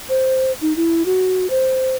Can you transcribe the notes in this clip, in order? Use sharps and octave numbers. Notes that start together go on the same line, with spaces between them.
C5
D#4
E4
F#4
C5